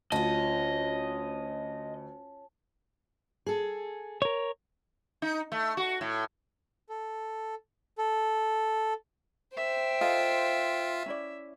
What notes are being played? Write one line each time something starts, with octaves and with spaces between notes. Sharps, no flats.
D2 C#4 F4 D#5 A5
G#4 A4
A#4 C#5
D#4
A3
F#4
A2
A4
A4
C5 E5 G5
F4 A4 D#5 F5
C#4 E4 D5